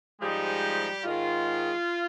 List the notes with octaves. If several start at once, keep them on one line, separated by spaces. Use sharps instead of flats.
G#2 F3 G3 G#3 D#4 G4
G#2 D#3 G#3 F4